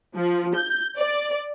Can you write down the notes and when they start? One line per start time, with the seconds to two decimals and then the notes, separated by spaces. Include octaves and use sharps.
0.17 F3
0.57 G6
0.97 D5